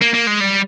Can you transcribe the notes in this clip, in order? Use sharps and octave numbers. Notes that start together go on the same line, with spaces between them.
A#3
A#3
G#3
G3